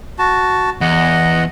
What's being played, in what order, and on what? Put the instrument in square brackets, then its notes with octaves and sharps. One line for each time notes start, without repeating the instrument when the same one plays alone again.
[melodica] F#4 A5
[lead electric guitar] E2 [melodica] D#5 F#5